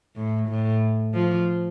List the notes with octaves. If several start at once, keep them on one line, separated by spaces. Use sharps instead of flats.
A2
A2
F3